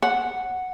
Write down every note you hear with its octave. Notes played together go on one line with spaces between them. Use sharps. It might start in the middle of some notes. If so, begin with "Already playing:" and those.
F#5